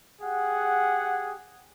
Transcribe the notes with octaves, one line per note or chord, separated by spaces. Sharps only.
G4 G#4 F#5